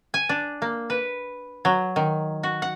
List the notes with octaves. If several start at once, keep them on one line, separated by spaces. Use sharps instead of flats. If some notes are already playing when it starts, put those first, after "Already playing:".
G#5
D4
A#3
B4
F#3
D#3
F#4
F#5